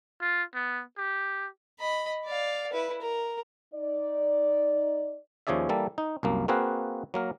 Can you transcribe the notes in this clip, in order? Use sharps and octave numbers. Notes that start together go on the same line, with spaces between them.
F4
B3
G4
D#5 B5
D5 F5
E4 B4
A#4
D#4 D5
D#2 F3 C#4 G#4 D5 E5
E3 G3 A#3 A4
D#4
C2 F#2 A#3
A#3 C4 F#4 G#4 B4 F5
F#3 A#3 A#4